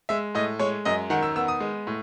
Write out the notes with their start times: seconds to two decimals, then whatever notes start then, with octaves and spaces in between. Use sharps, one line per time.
0.09 G#3 E5
0.35 A2 D#5
0.59 G#3 C#5
0.85 F#2 D#5
1.10 D#3 F#5
1.23 E6
1.36 B3 E6
1.48 D#6
1.60 G#3
1.87 A2